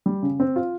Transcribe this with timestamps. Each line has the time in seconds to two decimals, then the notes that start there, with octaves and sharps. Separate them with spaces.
0.06 G3
0.22 C#3
0.40 C4
0.56 F4